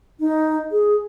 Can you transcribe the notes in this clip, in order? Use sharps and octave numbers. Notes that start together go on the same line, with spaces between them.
D#4
G#4